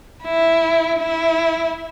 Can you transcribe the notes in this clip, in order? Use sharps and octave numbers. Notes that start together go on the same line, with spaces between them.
E4
E4